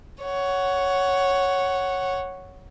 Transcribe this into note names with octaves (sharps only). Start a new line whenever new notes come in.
C#5 F#5